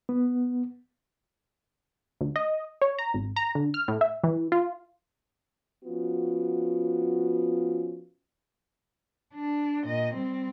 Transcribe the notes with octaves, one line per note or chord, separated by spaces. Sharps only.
B3
D2
D#5
C#5
A#5
G#1
A#5
D3
F6
A2
E5
E3
F4
F3 B3 C#4 F4 F#4
D4
A#2 D#5
G3 C4